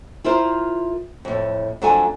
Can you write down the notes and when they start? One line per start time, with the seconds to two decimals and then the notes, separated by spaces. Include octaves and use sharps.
0.24 E4 F4 A#4 C5
1.25 F2 A2
1.82 F2 F#3 A3 D4 A4 G#5